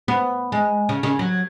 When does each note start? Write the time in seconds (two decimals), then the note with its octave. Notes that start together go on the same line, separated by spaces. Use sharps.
0.08 B3
0.52 G#3
0.89 C#3
1.03 C#3
1.19 F#3